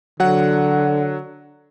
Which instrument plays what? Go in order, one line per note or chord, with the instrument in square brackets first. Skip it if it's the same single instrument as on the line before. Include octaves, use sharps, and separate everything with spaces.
[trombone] D3 [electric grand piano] F#3 F#5